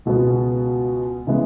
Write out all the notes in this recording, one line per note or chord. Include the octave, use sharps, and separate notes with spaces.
C#2 B2 G#3 B3
C#3 E3 G#3 B3